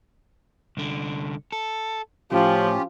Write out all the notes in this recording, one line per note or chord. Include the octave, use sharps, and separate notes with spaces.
C2 D3
A4
A2 F3 C#4 F4 G4